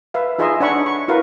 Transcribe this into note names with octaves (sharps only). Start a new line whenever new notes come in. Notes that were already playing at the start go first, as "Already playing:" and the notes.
B4 E5 F5
D#4 F4 G#4 D#5 E5 C6
D4 C#5 F#5 B5 C#6
C#6
E4 F#4 A#4 B4 F5